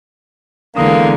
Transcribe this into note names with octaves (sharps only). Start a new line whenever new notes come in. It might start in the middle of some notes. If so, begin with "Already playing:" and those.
D3 E3 G#3 A#3 B3 D#6